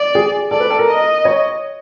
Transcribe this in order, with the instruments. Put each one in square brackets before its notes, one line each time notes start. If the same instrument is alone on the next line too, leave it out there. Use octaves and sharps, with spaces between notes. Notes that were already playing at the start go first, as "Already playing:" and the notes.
Already playing: [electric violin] D5
[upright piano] G#4
[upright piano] A4 [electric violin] D5
[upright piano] B4
A4
A#4
[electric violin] D#5
[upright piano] C#5